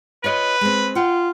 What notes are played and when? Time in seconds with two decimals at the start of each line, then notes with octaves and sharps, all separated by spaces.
0.24 F4 B4 C#5 D#5
0.61 G#3 C4
0.95 F4 F#5 G5